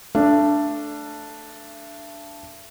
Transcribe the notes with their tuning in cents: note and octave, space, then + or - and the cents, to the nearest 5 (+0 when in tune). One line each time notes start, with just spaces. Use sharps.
A3 +0 D4 +0 E5 +40